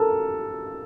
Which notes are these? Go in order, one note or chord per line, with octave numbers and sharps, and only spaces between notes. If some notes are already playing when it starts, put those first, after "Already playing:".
Already playing: A4 A#4